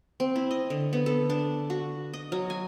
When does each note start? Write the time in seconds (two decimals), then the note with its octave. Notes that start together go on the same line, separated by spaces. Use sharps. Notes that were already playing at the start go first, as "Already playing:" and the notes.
0.20 C4
0.36 E4
0.51 D#5
0.70 D3
0.93 B3
1.06 A4
1.30 D4
1.70 F#4
2.13 D#5
2.32 F#3
2.50 G#5